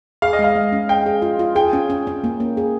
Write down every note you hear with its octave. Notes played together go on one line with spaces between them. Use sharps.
G#4 F5
D#5
G#3
F5
G#3
C#4
G#4 G5
G#4
F4
F4
G#4 G5
C#4
C#4
C#4
A#3
A#3
G#4